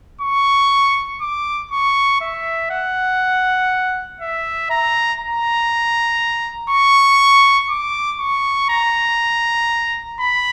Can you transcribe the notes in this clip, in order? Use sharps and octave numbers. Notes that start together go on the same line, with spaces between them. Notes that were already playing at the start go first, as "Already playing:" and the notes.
C#6
D6
C#6
E5
F#5
E5
A#5
A#5
C#6
D6
C#6
A#5
B5